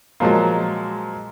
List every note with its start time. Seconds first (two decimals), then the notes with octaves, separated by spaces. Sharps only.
0.20 A#2 F3 F#3 G#3